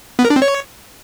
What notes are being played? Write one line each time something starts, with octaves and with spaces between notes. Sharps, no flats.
B3
A#4
D4
C4
C#5